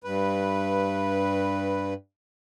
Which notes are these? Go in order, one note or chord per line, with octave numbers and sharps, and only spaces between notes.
G2 B4